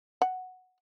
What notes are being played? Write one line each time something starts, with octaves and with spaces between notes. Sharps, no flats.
F#5